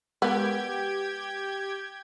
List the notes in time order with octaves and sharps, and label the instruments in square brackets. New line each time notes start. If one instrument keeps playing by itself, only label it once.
[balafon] G#3 A#4 [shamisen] B3 [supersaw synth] G4 G5 G#6